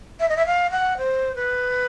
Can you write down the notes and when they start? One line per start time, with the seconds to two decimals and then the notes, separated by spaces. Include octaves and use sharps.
0.20 E5
0.29 D#5
0.37 E5
0.46 F5
0.71 F#5
0.98 C5
1.36 B4